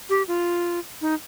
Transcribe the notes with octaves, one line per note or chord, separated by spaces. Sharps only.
G4
F4
D#4